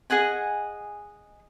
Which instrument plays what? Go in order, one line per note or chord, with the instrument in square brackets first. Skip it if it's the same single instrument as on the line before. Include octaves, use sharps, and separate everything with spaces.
[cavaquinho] G#4 D#5 F#5 G#5